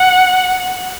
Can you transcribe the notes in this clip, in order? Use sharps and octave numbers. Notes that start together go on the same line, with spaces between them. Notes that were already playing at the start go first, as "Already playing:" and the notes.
Already playing: F#5